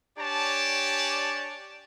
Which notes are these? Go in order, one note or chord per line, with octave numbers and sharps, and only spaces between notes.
D4 G4 C#5 D5 G#5 A5